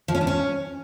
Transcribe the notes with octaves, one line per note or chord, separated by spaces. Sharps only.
F3
C#4
D4
C#4